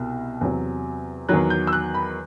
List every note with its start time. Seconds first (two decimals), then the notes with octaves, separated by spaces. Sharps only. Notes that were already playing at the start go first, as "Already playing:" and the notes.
Already playing: C2 B2
0.41 E2 C3 F#3
1.29 E2 D#3 F#3 F#6
1.50 G6
1.67 E6
1.73 F#6
1.95 B5